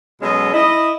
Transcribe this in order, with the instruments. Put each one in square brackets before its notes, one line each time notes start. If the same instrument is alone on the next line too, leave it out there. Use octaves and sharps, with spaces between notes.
[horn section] B2 F#3 G#3 C#4 A4 D#5
E4 D#5